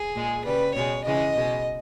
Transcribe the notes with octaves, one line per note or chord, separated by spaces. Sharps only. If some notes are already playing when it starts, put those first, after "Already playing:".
Already playing: G#4
A#2 G#3
C#3 G3 B4
B2 G#3 C#5
C#3 E3 G#3 D#5
B2 G#3